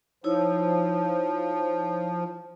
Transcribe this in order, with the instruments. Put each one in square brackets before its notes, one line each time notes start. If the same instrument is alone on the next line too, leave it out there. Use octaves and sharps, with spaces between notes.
[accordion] F3 [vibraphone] D#4 E4 C#5